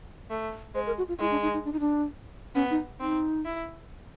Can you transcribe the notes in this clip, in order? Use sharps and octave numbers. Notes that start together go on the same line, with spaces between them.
A3
G#3 C5
A#4
F#4
F4
G#3 E4
D4
D#4
D#4
D4
D#4
D4
B3 C#4
D#4
C4 D#4
E4